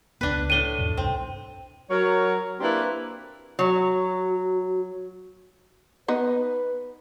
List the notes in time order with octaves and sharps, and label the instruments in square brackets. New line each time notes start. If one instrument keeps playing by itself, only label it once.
[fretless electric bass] C#2 G2 B3 [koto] D4 B4
[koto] A2 D4 [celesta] D#7 G7
[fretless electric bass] E2 G#2 B2
[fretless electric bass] C2 G2 D4 [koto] C4
[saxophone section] F#3 A#4 C#5
A#3 C4 D4 E4 G4 B4
[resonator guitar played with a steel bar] F#3 [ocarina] F#4
[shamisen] B3 D#4 [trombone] B4